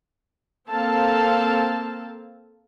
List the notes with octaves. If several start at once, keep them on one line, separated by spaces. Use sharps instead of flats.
A#3 C4 A4 F5 A5